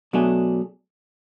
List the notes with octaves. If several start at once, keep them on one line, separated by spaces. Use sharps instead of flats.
B2 F#3 A3 D4 G#4